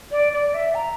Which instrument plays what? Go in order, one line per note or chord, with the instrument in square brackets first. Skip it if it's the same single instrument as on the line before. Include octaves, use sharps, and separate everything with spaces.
[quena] D5
D5
E5
A#5